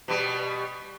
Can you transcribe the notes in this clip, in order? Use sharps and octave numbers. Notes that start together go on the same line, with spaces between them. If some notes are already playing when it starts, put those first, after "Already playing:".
B2 G3